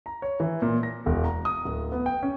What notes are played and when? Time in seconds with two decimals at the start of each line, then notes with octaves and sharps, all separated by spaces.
0.06 A#5
0.22 C#5
0.40 E3
0.62 A#2
0.83 A#6
1.06 E1
1.24 A#5
1.45 D#6
1.65 D1
1.92 B3
2.06 G5
2.23 C#4